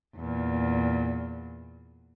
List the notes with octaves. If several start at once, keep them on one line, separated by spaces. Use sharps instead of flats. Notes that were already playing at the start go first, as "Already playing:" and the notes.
E2 A#2